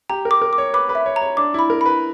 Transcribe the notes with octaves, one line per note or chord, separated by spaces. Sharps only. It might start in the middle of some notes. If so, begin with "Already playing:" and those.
G4 A#5
A#4
D6
A#4
D6
C#5
B4 D6
B4
E5
C#5
A#5
C#5
D4 D6
E4 B5
A#4
B4 B5